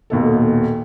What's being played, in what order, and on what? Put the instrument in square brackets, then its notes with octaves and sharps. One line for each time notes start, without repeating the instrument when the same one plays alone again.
[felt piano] D#1 D#2 B2 A4